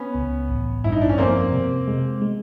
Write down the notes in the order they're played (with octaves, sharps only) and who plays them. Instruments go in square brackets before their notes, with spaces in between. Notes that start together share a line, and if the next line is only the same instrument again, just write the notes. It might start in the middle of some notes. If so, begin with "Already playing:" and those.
Already playing: [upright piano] B3 C#4
[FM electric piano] C#2
A1
[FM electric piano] G2 [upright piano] E4
[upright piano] D#4
D4
C#4
[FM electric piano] F2 [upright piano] A#3 C4
[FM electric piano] C3
G#3
G#3